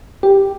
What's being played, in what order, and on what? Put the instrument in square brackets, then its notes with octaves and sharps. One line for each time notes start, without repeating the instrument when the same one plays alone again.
[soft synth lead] G4